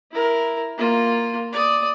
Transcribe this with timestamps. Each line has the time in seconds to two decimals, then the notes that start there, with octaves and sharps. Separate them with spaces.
0.11 E4 A#4
0.77 A#3 F4
1.52 D5 D#6